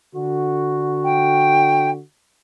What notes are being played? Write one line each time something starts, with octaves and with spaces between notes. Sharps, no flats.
D3 F#4
G5